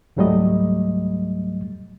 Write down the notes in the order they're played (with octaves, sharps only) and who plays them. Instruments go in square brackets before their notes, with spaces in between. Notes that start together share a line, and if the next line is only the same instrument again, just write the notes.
[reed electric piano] C#2 G#2 F#3 G3 A3 D#5